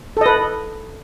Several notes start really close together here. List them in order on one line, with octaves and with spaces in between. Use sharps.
A4 D#5 B4